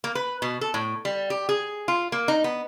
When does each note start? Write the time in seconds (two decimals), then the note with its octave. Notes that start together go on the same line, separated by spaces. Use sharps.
0.04 A#3
0.15 B4
0.42 B2
0.61 A4
0.74 A2
1.05 G3
1.30 G4
1.49 G#4
1.88 F4
2.12 A#3
2.28 D#4
2.44 B3